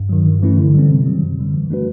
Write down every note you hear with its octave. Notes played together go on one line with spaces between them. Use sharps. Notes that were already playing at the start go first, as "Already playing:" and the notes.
Already playing: G2
D#3 F#3
G2
E3 A3 C#4 E4
D3
G3 C4
C3
D#3 F#3
F#2
D3 G3
E3
A3 D4 F#4 B4